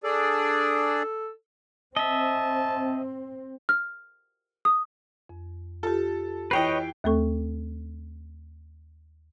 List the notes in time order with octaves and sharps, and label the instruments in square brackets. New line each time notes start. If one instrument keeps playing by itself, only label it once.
[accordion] D4 G#4 D5 [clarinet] A4
[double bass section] C4 [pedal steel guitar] D#5 E5 [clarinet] A5
[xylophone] F6
D#6
[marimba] F2
[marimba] F4 G4 [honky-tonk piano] A4
[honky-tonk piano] E3 G5 C7 [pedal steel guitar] B4 C#5 D#5
[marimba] D#2 A3 C4 A4 C#6